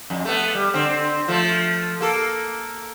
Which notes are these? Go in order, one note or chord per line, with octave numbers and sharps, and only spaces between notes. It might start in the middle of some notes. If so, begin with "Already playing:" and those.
F2
A3 B3
G3
D3 C4
F3 A3
A#3 A4